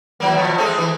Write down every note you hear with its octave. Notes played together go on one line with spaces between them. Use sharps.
E3 F#3 A#3
B2 F3
G#3 A3 C4
E3